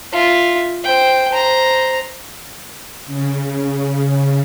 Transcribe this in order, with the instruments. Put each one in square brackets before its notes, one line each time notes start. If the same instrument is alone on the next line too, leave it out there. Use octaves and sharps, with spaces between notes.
[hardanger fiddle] F4 E5
C5 G5
C5 A#5
[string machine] C#3